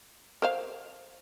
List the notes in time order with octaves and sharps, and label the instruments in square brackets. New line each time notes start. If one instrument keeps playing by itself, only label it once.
[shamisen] A#4 C5 F5